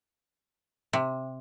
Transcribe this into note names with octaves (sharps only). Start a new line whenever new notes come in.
C3